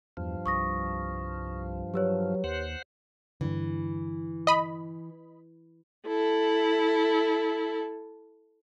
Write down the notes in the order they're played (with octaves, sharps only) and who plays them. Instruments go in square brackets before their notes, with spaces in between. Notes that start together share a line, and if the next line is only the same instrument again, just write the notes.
[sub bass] E2 [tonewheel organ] G2 F3
[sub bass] C2 [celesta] C#6 D#6 A#6
[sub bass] F#3 [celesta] G4 B4 C#5
[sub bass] D#2 [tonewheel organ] C5 F#5
[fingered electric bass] G2 D3 [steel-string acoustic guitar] E3
[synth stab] D#5 B5
[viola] E4 A4